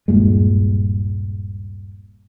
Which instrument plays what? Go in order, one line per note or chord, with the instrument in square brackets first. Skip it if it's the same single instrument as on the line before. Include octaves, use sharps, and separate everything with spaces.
[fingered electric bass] D#1 G2 A#2 G#3